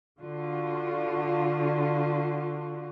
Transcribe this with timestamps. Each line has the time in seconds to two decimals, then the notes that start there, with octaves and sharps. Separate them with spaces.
0.19 D3 F4 F#4